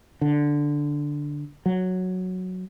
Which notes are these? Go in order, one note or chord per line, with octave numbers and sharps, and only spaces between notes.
D3
F#3